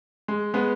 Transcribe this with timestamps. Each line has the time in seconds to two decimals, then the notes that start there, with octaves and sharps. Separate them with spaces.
0.28 G#3
0.54 G#3 B3